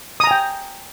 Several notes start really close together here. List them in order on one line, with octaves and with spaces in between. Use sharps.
D#6 A#5 G#5 G5